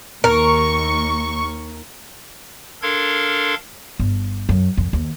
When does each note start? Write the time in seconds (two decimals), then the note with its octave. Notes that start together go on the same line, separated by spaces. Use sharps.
0.24 D#2 A#4 C#6
2.82 D4 A4 A#4 F5 C6 G#6
3.99 G1
4.49 F#2
4.77 F2
4.93 D#2